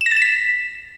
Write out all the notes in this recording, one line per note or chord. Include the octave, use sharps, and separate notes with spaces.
E7
A#6
A6
E7
B6